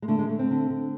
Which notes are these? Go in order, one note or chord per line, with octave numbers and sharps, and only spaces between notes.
G#3
D3 A3
G#3
D3 A3
C4
D3
D3